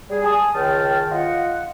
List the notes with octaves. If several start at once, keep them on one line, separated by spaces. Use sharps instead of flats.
G3 G#4
G#5 A5 D#6
C#2 D#3 G5 A5 F6
F4 D#5 F#5